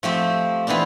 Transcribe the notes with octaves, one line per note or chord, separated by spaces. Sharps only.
F3 A3 C4 G4
E3 B3 C4 D4 F4